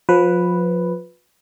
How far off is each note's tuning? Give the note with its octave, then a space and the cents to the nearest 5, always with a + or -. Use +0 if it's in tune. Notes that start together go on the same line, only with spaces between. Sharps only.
F3 +30 B4 +0